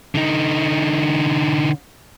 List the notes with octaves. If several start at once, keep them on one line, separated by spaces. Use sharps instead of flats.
D3 D#4